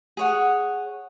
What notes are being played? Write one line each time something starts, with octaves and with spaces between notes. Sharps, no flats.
G#4 C#5 F#5